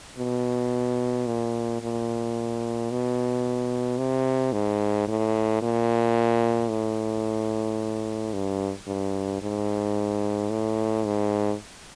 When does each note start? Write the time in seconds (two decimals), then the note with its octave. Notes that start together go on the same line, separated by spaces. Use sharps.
0.18 B2
1.26 A#2
1.82 A#2
2.91 B2
3.98 C3
4.53 G#2
5.07 A2
5.62 A#2
6.69 A2
8.33 G2
8.87 G2
9.42 G#2
10.50 A2
11.04 G#2